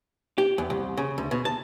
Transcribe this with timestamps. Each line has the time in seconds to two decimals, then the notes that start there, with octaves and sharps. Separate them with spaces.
0.38 G4
0.58 E2
0.70 C2
0.97 C#3
1.18 D2
1.31 B2
1.45 A5